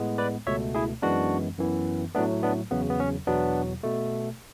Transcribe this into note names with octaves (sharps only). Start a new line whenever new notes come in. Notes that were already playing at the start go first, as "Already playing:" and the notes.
Already playing: A2 G#3 B3
B4 D5
C#2 B2 A3 C#5 E5
E4 G#4
F#2 E3 G#3 B3 D4 F#4
F#2 E3 B3
A2 F#3 A3 B3 D4
B3 D4
E2 C#3 F#3 B3
B3
C#4
E2 B2 F#3 B3 D4
B2 A3